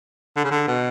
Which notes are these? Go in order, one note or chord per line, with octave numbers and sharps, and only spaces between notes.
D3
C#3
D3
B2